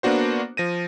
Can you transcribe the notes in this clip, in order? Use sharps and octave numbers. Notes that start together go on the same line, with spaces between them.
A#3 B3 D4 F#4 C5
F3 A#6 D#7